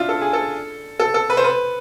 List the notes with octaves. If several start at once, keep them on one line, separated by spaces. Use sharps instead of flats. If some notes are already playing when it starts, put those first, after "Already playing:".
Already playing: D4 E4 F4
A4
G#4
A4
A4
A4
B4
C5
B4